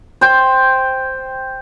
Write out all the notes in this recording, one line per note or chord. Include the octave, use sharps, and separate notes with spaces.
C5 G5